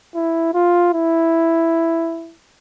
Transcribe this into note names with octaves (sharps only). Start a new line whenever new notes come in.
E4
F4
E4